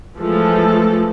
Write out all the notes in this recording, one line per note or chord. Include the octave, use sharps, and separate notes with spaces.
E3 F3 G#3 A3 A4